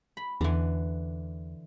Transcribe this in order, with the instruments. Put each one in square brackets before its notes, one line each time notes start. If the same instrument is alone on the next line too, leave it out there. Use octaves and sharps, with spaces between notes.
[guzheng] B5
[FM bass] E2 [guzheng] D3 E3